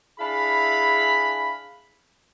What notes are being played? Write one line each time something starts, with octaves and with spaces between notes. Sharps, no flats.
D4 E4 G#4 F5 B5